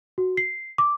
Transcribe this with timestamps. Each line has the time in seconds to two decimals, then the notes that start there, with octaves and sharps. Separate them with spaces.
0.18 F#4
0.37 C7
0.78 D6